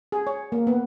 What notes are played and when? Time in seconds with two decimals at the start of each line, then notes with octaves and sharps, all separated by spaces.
0.12 G#4
0.27 C#5
0.52 A#3
0.67 B3